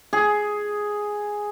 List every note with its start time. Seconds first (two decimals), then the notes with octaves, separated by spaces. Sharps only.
0.13 G#4